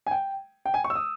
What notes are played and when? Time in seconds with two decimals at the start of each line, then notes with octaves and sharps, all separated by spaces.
0.06 G#5
0.11 G5
0.66 G5
0.74 G#5
0.84 C#6
0.90 E6
0.95 D#6